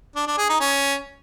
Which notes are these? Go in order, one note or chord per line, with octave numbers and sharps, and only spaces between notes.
D4
D4
G#4
D#4
C#4